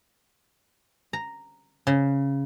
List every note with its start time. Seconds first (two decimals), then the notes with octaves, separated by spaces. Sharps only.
1.13 A#5
1.87 C#3